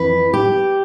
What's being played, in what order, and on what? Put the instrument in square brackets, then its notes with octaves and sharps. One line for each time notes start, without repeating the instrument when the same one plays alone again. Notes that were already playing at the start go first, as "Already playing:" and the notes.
Already playing: [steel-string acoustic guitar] F2 E3 B4
G4